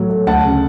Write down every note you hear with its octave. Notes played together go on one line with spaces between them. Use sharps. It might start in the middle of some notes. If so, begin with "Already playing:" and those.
Already playing: A2 F#3
A3
D2 F#5 A5
C#3